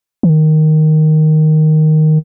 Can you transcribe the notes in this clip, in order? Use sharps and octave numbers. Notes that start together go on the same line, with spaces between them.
E3
D#3